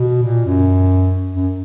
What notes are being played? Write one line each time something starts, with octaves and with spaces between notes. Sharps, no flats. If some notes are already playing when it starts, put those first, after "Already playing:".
Already playing: B2
A#2
F#2
F#2